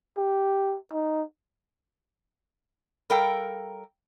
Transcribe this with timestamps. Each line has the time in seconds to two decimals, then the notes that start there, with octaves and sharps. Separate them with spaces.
0.17 G4
0.92 D#4
3.10 G3 A4 A#4 F5 G5